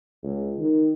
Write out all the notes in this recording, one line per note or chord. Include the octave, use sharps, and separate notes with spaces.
C#2
D#3